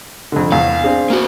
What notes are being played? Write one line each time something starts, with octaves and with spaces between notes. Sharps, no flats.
F2 D3
E2 F5
C4 D4 G#4
A#3 F#4